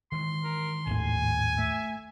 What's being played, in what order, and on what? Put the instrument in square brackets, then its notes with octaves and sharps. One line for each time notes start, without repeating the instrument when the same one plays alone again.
[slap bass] D#3 E3 G#3 [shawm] C6
[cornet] A#4
[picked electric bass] G#1 D#2 A2 [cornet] G#5
[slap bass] A3 [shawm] E5